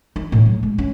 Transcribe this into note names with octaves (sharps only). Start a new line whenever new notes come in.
D#4
A2
F#3
G#3
C#4